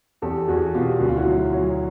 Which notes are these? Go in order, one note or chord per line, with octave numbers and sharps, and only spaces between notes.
E2 G4 A4
E2 F#4 G#4
B2 F4 G4
D2 F#4
F4
E4 F#4
F#3
F#3